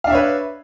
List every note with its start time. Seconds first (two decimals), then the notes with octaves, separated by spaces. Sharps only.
0.04 F5
0.07 D4
0.10 E5
0.12 C#5
0.15 B4